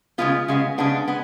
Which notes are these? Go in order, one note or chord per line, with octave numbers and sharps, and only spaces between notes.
C#3 G#3 B3 F4
C#3 G#3 B3
C#3 G#3 B3 D4
G#3 B3